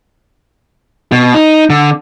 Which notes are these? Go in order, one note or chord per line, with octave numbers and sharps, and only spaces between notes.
B2
D#4
D3